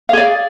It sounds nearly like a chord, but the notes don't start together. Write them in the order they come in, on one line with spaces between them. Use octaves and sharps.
F5 G#4 D5